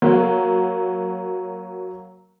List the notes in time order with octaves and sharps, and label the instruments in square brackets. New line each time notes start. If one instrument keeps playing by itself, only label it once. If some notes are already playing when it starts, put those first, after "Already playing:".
[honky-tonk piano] F#3 A#3